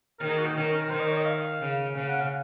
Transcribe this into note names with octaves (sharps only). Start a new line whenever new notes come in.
D#3 A#4
G#4
F#4
D#4
D#3 C#4
A#4
A#4
D#3 C5
D#5
C#5
D#5
F5
C#3
C#3 F5
F#5
F5